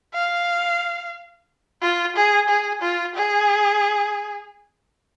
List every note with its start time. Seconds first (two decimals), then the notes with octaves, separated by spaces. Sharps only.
0.14 F5
1.81 F4
2.16 G#4
2.49 G#4
2.82 F4
3.15 G#4